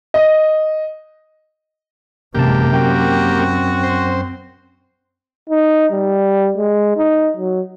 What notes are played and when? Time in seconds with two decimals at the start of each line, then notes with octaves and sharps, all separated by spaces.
0.14 D#5
2.35 A1 F#2 C3 G#3 A#3 G4 A5
2.73 F#2 C4 F#4 G5
3.83 C5
5.50 D#4
5.92 G3
6.57 G#3
6.97 D#4
7.37 F#3